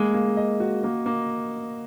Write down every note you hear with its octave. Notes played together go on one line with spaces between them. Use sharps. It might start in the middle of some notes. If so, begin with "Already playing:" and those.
Already playing: G#3 A#3 D#5
A#3
D#5
F#4
A#3
A#3